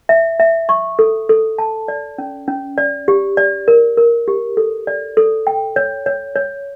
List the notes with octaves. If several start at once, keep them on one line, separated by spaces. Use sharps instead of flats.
E5
E5
C#6
A4
A4
A5
D5
C#4
C#4
D5
G4
D5
A#4
A#4
G4
A4
D5
A4
G5
C#5
C#5
C#5